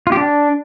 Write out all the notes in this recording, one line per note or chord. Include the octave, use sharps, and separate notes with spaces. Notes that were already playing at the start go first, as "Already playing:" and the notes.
F4
G4
D4